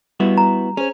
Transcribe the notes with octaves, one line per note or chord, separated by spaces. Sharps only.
G3 B3 E4 F#4
A#5
C#4 G#4 C5